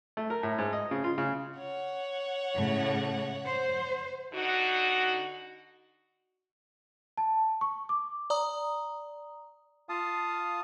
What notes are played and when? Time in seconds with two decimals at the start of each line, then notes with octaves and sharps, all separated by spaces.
0.17 A3
0.30 A#4
0.43 A2
0.58 G#2
0.73 D#5
0.91 C#3
1.04 F4
1.18 C#3
1.58 C#5 F#5
2.55 A2 C#3
3.45 C5
4.34 D3 D#4 F#4
7.18 A5
7.61 C#6
7.89 D6
8.30 D5 A#5 D#6
9.89 F4 F5 A5 D#6